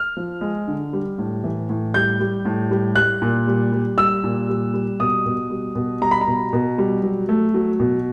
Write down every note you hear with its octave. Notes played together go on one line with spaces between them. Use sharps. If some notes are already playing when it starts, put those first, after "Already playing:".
Already playing: F6
F3
G#3
D3
G3
A2
E3
A2
G3 G6
G3
A2
G3
G3 F#6
A#2
G3
G3
G3 E6
A#2
G3
G3
B2 D#6
B2
G3
B2
G3 A#5
B5
A#5
B2
B2
G3
F#3
A3
F#3
B2